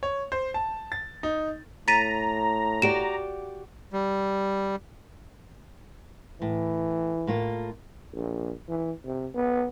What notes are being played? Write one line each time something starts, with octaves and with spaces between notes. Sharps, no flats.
C#5
C5
A5
A6
D#4
A2 A#5 A6 B6 D#7
F#4 G4 D5 D7 E7
G3
A2 E3
A2 A#3 F4
A#1
E3
C3
B3